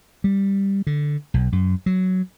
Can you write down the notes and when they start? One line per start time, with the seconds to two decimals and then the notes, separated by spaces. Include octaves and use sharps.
0.24 G3
0.87 D3
1.34 B1
1.52 F#2
1.86 F#3